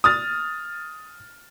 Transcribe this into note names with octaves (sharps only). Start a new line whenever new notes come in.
D#6 F6 A6